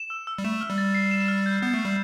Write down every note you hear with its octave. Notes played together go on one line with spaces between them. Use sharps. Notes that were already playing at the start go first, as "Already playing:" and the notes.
Already playing: E7
E6
E6
G3
A3 E7
F6
G3
A6
C7
E7
F6
G6
B3 G6
A3
C7
G3